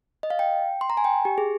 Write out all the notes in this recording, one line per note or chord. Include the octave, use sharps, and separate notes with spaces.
D#5
F5
G5
C6
A#5
G#5
G5
G4
G#4